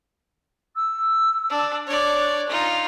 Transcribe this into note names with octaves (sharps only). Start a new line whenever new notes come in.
E6
D4
D4 C#5 D5
D#4 F4